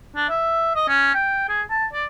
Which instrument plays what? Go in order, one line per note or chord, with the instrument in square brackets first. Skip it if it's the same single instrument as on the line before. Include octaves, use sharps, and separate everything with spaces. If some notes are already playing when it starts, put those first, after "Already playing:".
[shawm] D4
E5
D#5
C#4
G5
G#4
A5
D5